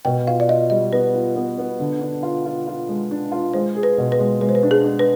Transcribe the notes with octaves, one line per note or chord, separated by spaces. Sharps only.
B2 G5
F4 F5
D5
F4 D#5
G3 D#5
B3 B4
F4
B3
B3
D3
D4
F4
F4
F4
G#3
D4
F4
G#3 C5
G#4
B4
B2
B4
G#3
G#3 B4
C5
B4
D4
G#4
D4
B4